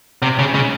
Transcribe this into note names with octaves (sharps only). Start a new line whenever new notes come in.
C3
C#3
C#3